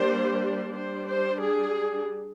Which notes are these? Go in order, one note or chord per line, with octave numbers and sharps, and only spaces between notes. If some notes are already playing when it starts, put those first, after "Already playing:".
Already playing: G3 A#3 D4 C5
G3 D4 C5
C5
G#4